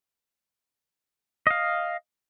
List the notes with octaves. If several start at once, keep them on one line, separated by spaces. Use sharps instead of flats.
D#5 F5